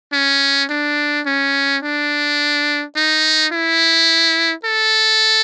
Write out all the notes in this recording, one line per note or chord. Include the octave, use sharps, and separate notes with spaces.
C#4
D4
C#4
D4
D#4
E4
A4